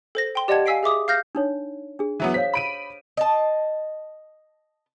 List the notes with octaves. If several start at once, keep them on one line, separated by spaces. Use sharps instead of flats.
A4 C5 A#6
G5 C6
G4 D5 D#5 F#5 A5 G#6
F5 G#5 E6 B6 C7 D7
G#4 E5 D6 D#6
F5 F6 G6 A#6
D4 D#4 C#5
D4 G#4
E3 F#3 B3
C5 C#5 F5 B6
B5 D7 D#7
D#5 A5